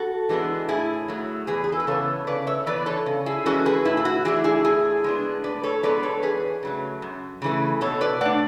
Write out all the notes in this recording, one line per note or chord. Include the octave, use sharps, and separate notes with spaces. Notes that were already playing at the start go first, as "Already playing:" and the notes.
Already playing: F#4 A4
E3 G#3 B3 D4
A2 E4 G#4
F#3 A3
E2 G#4 B4
G#4
A4
B4
C#3 E3 B3 A4 C#5
C#3 B4 D5
C#5 E5
E3 B3 B4 D5
A4 C#5
C#3
E4 G#4
E3 G#3 C#4 F#4 A4
G#4 B4
A2 E4
E4
F#4
E3 A3 D4 E4 G#4
E4 G#4
A2 E4 G#4
G#3 B3 D4
A2 B4 D5
A4 C#5
G#3 B3 D4 B4 D5
A4 C#5
E2 G#4 B4
C#3 F#3 A3
F#2
C#3 E3 A3
B2 A4 C#5
B4 D5
A3 D4 D5 F#5